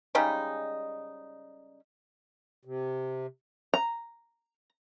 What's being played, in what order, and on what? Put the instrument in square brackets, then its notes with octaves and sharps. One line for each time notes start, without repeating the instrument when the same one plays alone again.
[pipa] C#3 G3 G#3 D#4
[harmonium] C3
[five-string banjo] A#5